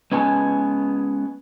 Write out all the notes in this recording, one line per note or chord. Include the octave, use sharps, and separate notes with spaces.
G#3 B3 C#4 B4 G#5 A5